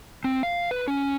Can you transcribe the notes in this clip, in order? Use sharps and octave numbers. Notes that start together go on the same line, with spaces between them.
C4
F5
B4
C#4